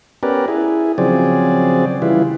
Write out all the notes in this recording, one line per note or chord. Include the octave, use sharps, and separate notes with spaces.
B3 C#4 G4 A#4 B4 D5
E4 G#4
C#3 F3 F#3 C4 G#4 D5
C#3 E3 G3 E4 F4 B4